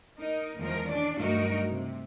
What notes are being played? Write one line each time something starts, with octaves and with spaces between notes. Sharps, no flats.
D#4 A#4
E2 D#3 F3 G#3 A#4
C#4 D4 D5
D2 G2 F#3 D#4 F#4 A#4
C3